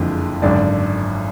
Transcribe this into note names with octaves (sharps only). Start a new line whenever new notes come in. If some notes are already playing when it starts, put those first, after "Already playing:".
Already playing: F#1 F2 D3 F3 G#3
G#1 F#2 D3 D5